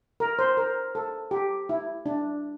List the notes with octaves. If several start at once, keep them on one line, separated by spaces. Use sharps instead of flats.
A#4
C5
A#4
A4
G4
E4
D4